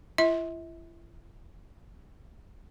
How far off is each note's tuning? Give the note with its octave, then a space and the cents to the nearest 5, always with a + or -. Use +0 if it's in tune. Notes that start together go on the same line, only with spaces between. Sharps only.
E4 +45 E5 -35